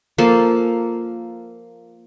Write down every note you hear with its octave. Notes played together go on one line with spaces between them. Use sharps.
F3 A#3 A4